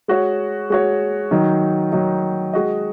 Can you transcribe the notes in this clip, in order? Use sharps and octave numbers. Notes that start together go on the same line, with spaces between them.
G#3 F#4 C#5
G#3 F#4 C#5
D#3 F#3 D#4
D#3 F#3 D#4
G#3 F#4 D#5